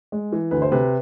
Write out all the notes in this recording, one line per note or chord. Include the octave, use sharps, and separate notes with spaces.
G#3
E3
D2 B4
C5
C3 B4